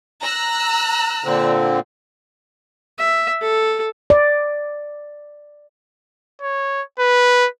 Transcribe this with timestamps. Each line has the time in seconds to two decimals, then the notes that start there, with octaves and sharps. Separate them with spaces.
0.21 A#5 E6 F#6
1.24 A#2 D3 C4
2.98 E5
3.42 A4
4.10 D5
6.42 C#5
6.99 B4